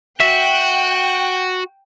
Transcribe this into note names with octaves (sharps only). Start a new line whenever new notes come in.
F#4 E5 G5 F#6